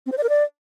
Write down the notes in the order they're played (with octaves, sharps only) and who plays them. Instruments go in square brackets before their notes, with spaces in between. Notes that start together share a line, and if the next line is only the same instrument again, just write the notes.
[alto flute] C4
C5
D5
A#4
D5